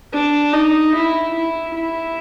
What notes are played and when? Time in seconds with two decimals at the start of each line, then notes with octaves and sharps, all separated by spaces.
0.13 D4
0.53 D#4
0.95 E4
1.34 E4
1.74 E4